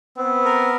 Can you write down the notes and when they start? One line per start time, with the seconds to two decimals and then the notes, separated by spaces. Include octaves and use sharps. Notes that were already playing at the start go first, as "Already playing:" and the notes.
0.18 B3 C4
0.45 A#4